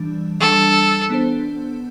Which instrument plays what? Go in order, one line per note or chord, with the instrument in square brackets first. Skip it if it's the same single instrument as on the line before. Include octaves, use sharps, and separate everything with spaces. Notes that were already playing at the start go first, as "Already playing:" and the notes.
Already playing: [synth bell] E3 G3 D4
[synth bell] E3 G3 D4 [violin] A4
[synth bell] B3 D4 A4 C5